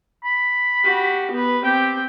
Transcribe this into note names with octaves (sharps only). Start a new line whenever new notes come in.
B5
F#4 G4
B3 B4
C4 G4 G5